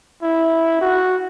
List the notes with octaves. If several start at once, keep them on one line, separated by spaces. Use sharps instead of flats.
E4
F#4